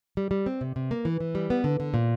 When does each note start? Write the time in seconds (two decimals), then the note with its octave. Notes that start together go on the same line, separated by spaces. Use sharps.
0.17 G3
0.31 G3
0.46 C4
0.61 C3
0.76 C3
0.91 A#3
1.05 E3
1.20 E3
1.35 G3
1.50 B3
1.64 D3
1.80 D3
1.94 A#2